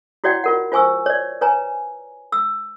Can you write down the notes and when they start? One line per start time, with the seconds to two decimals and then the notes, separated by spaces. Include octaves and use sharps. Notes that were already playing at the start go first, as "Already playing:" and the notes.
0.24 E4 F#4 C#5 D5 F#5 G5
0.44 F4 A#4 F#5
0.72 F4 C5 G#5 C#6 E6
1.06 C#5 D5
1.41 B4 C#5 G#5 A#5
2.32 E6